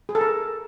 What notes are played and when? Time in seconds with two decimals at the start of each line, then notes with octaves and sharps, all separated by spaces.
0.09 G#4
0.15 A4
0.21 A#4